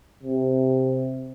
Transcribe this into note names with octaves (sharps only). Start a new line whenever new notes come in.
C3